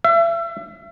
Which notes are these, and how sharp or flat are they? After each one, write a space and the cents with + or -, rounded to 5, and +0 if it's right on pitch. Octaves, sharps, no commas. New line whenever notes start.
E5 +35